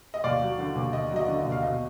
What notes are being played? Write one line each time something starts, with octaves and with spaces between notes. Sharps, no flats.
D#5
D#2 D5 F5
F#3
D3
D#2
D#2 D#5
F#3
D#5
D3
D#5
D#2
F5
B1 D#5